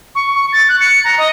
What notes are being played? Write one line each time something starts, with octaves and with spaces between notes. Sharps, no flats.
C#6
C#6
A6
F#6
C#7
A#5
D#5